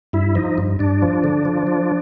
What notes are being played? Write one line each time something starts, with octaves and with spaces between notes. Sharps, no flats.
G2 E4
F3 D#4
G2
G2 D4
F3
D3
F3
F3